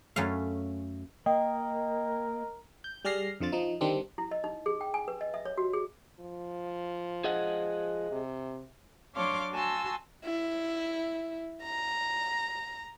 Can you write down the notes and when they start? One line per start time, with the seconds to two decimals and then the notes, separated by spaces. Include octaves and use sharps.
0.16 F#2 A3 C#4 F5
1.26 A#3 A#4 D#5 G5
2.84 G6
3.05 G3 G#4 D5 F6 A#6 C7
3.40 F2 D3 F3 F4 A6
3.52 F3 D#4
3.81 D3 D#3 G3 C4 D4
4.18 E4
4.31 D#5
4.44 D#4
4.66 G#4
4.81 G5
4.94 G#5
5.08 B4
5.21 D#5
5.34 E5
5.45 C#5
5.57 F#4
5.73 G#4
6.19 F3
7.24 G#4 D#5 F#5
8.11 C3
9.14 F#3 D4 C#5 F5 C6 D6
9.52 F#4 G#5 A5 C6 E6
10.25 E4
11.63 A#5